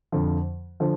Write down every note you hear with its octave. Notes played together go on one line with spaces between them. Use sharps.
F2 D3 F3
D3 F3